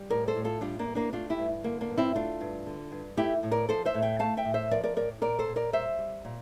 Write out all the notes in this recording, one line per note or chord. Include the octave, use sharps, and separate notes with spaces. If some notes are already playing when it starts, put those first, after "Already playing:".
Already playing: G3
A2 A#4 D5
A4 C5
A2
F4 A4
G3 D4 F4
A#3 D4
G3
A#3 D4
A3 D4 F4
E4 G4
G2
D3 A#3
A#3 D4
G2
C4 E4
A3 D4 F4
G2
D3
G2
A3 E4 G4
A2
A#4 D5
F3 A4 C5
C5 E5
A2
E5 G5
A3 F5 A5
E5 G5
A2
C5 E5
F3 A#4 D5
A#4 D5
A2 A#4 D5
A#2 A#4 D5
A4 C5
A#2
A#4 D5
G3 C5 E5
G3
A#2